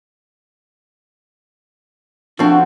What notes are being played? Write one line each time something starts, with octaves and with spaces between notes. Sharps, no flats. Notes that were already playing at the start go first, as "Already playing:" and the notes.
F3 A3 C4 D4 F#4